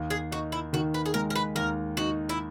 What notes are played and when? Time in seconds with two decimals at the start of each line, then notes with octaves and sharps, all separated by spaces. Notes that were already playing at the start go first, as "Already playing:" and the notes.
Already playing: D#2
0.10 G#4
0.31 D#4 F#4
0.52 E4
0.73 D#3 F#4
0.94 B4
1.06 G#4
1.14 G#3 A#4
1.30 A#4
1.35 B4
1.55 D#2 A#4
1.97 D#4 F#4
2.29 E4